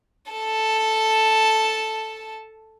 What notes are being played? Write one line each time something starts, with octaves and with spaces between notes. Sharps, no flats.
A4 A5